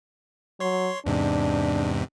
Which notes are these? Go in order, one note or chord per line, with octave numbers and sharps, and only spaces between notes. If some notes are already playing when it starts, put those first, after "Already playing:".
F#3 C#5 C6
E2 G#2 C3 D4